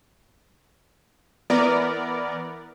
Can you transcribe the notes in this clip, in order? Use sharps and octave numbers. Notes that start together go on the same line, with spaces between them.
E3 B3 A#4 D5